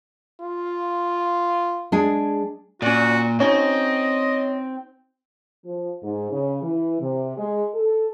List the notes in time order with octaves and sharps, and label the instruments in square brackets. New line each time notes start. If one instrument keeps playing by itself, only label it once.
[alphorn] F4
[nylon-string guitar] G#3 D4 G#4
[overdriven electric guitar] A#2 [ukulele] C#4 D5 [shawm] F#4
[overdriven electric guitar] C4 [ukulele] C#4 D#4 F#4 [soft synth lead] C#5 [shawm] D#5
[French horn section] F3
G#2
C#3
E3
C3
G#3
A4